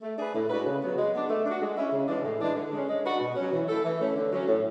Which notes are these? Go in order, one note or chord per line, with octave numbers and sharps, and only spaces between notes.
A3
D4 G#4 B4
A2
G#3 D4 F#4 B4
C#3
F#3 B3
G#3
B3 D4
A3
D4 F#4
G#3
C#4 E4
C#3
E3 G#3 D4
A2
E3 G#3 D4
D3
G#3 C#4
G#3
D4 F#4 B4
B2
F#3 C#4
E3
A3 E4 A4
E3
A3 C#4
D3
F#3 C#4
A2